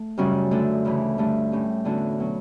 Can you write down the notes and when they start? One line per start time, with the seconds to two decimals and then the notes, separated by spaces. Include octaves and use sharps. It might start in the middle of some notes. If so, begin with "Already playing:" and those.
Already playing: A3
0.18 F#2 C#3 G3 C#4 F#4
0.51 D3 A3 D4 A4
0.85 D2 C#3 E3
1.18 G2 D3 A3
1.52 A2 G3 C#4 G4
1.85 E2 D3 A3 C#4 F#4
2.19 B2 F#3 C#4